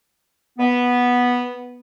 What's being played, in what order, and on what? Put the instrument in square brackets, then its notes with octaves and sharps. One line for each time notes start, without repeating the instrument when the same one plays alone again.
[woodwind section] B3